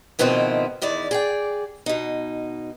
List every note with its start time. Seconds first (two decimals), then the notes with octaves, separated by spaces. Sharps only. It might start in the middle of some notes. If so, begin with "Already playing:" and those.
0.19 G#2 B2 D#3 F3 C4 E4
0.82 E2 D#3 E4 D5
1.11 G#4 D5 G5
1.86 B2 D#4